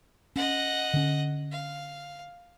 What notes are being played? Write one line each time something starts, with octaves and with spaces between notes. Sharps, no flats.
C#4 D#5 F#5
D3 C#4
F5